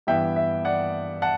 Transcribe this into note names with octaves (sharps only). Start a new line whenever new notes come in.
G2 E3 B3 E5 G5
E5
D5 F#5
F#5 A5